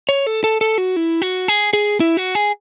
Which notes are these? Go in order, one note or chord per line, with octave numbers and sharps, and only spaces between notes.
C#5
A4
A4
A4
F#4
E4
F#4
G#4
G#4
E4
F#4
G#4